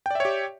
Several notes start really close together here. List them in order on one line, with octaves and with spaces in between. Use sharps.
G5 D5 E5 C#5 G4